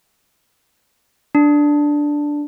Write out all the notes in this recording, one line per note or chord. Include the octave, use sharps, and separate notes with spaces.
D4